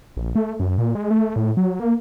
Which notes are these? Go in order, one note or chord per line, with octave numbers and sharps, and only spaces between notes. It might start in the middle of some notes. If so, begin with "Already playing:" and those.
A#1
A3
F#2
A#2
G#3
A3
A2
F#3
A#3